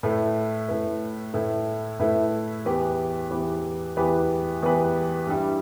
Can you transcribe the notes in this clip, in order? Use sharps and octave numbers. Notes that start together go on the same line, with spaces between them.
A2 A3 E4 B4
A2 A3 E4 B4
A2 A3 E4 B4
A2 A3 E4 B4
E2 E3 B3 G4 B4
E2 E3 B3 G4 B4
E2 E3 B3 G4 B4
E2 E3 B3 G4 B4
G2 G3 E4